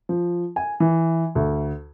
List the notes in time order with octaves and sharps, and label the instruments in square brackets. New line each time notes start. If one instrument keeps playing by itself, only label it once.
[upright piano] F3
G#5
E3
D2